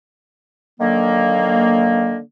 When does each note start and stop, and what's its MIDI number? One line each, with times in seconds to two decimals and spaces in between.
0.80 2.18 50
0.80 2.18 51
0.80 2.18 54
0.80 2.18 58